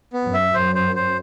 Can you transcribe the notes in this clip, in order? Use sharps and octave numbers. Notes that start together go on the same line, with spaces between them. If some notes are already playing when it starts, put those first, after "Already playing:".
B3
F#2
E5
F#2 C5
C5
C5